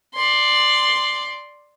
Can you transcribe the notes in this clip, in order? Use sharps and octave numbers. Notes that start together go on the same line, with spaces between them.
D5 C6